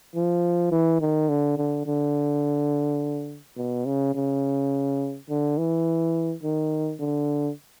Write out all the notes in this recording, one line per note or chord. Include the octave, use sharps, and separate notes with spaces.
F3
E3
D#3
D3
D3
D3
B2
C#3
C#3
D3
E3
D#3
D3